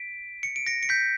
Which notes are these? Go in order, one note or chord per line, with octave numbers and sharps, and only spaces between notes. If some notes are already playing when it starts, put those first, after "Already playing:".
Already playing: B6 D7
C#7
D7
A#6 C#7
C#7
G6 B6